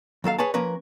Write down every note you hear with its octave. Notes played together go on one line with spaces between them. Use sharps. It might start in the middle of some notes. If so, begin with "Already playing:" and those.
D#2 F#3 A4 F5
G#4 B4 C#5 G#5 A5
F3 A#3 C#4 A#4 B4